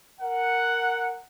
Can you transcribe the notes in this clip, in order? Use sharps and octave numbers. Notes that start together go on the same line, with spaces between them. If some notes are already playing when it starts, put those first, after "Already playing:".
A#4 F#5